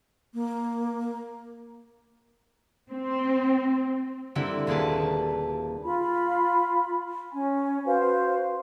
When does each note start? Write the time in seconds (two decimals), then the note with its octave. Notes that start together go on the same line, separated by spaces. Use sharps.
0.34 A#3
2.89 C4
4.35 D3 G3 A#3 C4 E4
4.67 D#1 A#3 G#4 B4 A5
5.84 F4 B5
7.32 C#4 G#5
7.85 F#4 B4 C5 F5